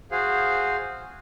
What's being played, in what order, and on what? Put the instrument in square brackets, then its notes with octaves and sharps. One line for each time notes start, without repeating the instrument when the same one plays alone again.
[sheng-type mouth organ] F#4 G#4 C5 F5